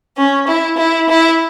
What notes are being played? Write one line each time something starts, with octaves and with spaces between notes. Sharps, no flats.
C#4
E4
E4
E4